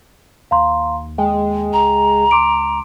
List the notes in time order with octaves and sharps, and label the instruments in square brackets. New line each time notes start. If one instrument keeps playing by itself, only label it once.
[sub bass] D#2 [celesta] F5 A#5 C6
[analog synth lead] G#3 [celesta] G5
[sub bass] C#2 [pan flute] A#5
[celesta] C6 D6 D7